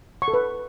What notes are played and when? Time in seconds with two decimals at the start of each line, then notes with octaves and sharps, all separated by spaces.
0.22 C#6
0.28 A4
0.34 B4